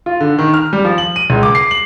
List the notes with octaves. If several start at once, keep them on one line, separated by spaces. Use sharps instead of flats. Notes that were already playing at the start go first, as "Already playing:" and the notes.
F4
D3
D#3
F6
G3
F3
F#7
D#7
C#2
D6
C7
F#7